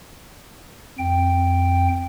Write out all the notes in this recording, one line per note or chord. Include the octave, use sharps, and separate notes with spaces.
F2 G5